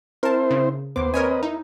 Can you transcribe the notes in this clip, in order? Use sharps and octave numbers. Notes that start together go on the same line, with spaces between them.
C4 E4 A#4 C5 A5
C#3
D#2 B3 C5 D6
C4 A#4 B4 C#5 D#5 G#5
D#4 E4